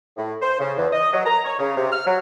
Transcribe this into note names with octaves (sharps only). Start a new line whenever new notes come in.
A2
C5
C#3
E2
D#5
F#3
A#5
C#5
C#3
C3
F6
F#3